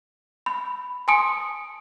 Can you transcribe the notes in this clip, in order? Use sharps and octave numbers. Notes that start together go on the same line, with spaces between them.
B5
G#5 A5 C6 D#6 C#7 D7